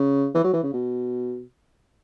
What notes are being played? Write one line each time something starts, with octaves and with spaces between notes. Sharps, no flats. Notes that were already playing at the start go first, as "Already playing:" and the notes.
Already playing: C#3
E3
F#3
E3
C#3
B2